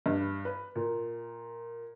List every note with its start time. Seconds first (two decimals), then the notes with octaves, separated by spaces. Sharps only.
0.06 G2
0.45 B4
0.75 A#2